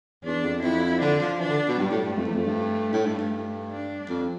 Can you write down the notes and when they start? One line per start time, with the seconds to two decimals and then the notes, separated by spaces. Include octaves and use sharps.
0.25 E2 D4
0.44 F2
0.63 F2 E4
1.01 D3 D4
1.20 F3
1.40 E3 D4
1.49 D3
1.68 B2
1.78 G2 G3
1.91 A2
2.04 G2
2.16 F2 A3
2.26 E2
2.35 F2
2.46 G2
2.93 A2
3.06 G2
3.19 G2
3.71 D4
4.09 F2